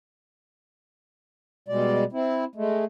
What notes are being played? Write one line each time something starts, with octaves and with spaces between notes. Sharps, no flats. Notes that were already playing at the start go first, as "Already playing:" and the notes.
B2 G3 G#3 D5
C4 E4
G#3 A3